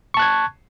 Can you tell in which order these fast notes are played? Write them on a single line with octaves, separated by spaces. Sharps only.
C#6 A5 F#6 G#6